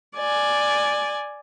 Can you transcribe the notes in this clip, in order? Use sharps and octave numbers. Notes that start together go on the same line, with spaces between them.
D5 G#5